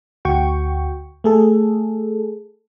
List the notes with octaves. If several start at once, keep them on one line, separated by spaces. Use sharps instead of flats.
D2 F#4 G5 C#6
A3 G#4 A4